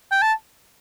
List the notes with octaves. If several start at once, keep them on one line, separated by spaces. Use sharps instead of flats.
G5
A5